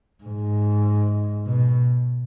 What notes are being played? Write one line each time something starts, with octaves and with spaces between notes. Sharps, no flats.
G#2
B2